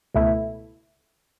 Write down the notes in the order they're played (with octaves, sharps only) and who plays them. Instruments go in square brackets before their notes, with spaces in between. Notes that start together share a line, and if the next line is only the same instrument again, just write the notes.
[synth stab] C#2 B2 A3 E4